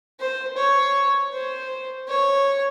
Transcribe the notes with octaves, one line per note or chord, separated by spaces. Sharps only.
C5
C#5
C5
C#5